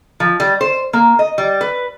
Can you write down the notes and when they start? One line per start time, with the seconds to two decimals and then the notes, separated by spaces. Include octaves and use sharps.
0.20 F3
0.40 G3
0.61 C5
0.93 A#3
1.19 D#5
1.38 G3
1.61 B4